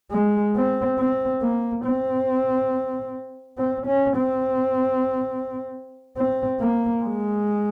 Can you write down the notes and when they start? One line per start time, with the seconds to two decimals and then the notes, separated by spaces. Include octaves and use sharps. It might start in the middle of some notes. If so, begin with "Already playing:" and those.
0.12 G#3
0.56 C4
0.99 C4
1.42 A#3
1.85 C4
3.58 C4
3.87 C#4
4.16 C4
6.17 C4
6.61 A#3
7.03 G#3